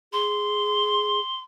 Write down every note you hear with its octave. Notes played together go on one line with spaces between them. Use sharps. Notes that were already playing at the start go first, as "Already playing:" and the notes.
G#4 C6